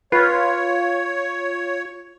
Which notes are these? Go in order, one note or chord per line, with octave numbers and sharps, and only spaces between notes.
F4 B4 C#5